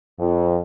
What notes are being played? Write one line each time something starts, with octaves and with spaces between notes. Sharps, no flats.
F2